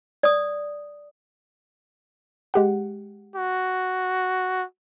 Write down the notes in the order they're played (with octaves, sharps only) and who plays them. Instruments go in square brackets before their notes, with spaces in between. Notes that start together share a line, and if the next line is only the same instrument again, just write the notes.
[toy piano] D5 D#6
[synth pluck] G#3 G4 F#5
[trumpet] F#4